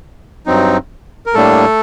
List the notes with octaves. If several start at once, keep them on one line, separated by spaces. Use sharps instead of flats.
G2 F#3 C4 D#4
A#4
A2 G3 A3 A#3 D4 A4